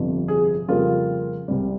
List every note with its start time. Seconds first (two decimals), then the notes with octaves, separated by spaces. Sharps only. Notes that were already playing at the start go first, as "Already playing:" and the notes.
Already playing: G1 F2 C3 F3
0.28 G#4
0.68 F2 C#3 G3 A#3 F4
1.48 C2 C3 G3